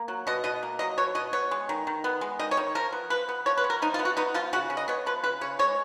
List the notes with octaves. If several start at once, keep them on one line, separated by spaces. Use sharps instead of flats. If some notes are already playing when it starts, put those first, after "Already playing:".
Already playing: A#3
F#3
B2 D#5
B2 D#5
A#3
F#3 D#5
B2 C#5
B2 D#5
B3 C#5
G#3
D#3
D#3
B3
G#3
D#3 D#5
C#5
D#3
F3 A#4
B3
F3 B4
B3
F3 C#5
B4
B3
A#4
F3 D#4
F4
B3
F#4
B3 D#4
F3 F4
C#3 F#4
C#3
D#5
B3 C#5
F3 B4
C#3 B4
C#3 C#5
G#3 C#5